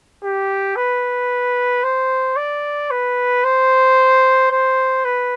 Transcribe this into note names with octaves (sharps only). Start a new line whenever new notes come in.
G4
B4
C5
D5
B4
C5
C5
B4